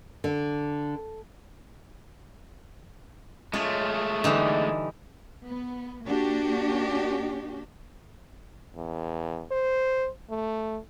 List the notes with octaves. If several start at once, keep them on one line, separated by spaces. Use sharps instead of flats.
D3
G#3 A3 F4 C#5
D3 E3 G3 D#4
B3
A#3 D4 F#4 G4
E2
C5
A3